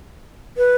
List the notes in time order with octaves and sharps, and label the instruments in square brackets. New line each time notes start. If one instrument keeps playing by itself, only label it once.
[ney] B4